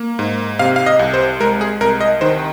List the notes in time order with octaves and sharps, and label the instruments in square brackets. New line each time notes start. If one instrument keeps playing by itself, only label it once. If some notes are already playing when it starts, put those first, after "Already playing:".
Already playing: [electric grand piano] A#3
G#2
C3 F5
F5
D#5
C2
C5
G#3 A#4
G#4
C2 A#4
D#5
D#3 C5